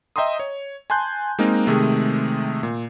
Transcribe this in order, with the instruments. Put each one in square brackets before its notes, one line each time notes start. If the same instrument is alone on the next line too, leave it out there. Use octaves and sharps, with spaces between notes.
[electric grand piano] D#5 E5 G5 A#5 C6 D#6
C#5
G#5 A5 C6 F#6 G6
G#3 A#3 C4 D#4 A#4
C3 D#3 G#3 A3 C4 G#4
A#2